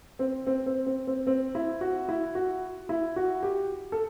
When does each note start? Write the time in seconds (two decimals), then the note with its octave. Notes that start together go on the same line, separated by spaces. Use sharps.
0.19 C4
0.47 C4
0.66 C4
0.86 C4
1.07 C4
1.27 C4
1.55 E4
1.81 F#4
2.09 E4
2.35 F#4
2.89 E4
3.16 F#4
3.43 G4
3.92 A4